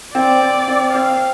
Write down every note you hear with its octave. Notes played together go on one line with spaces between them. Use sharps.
C4 D5
C4
C4
C4 F5